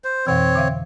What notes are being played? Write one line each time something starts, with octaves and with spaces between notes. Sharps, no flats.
C5
F2 B2 E3 C4 C#5
D3 E5 F5